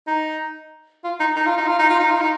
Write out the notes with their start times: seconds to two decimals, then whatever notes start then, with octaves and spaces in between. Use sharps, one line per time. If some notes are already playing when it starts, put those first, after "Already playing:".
0.07 D#4
1.04 F4
1.20 D#4
1.36 D#4
1.46 F4
1.57 D#4
1.67 F4
1.79 D#4
1.89 F4
1.99 D#4
2.11 F4
2.21 D#4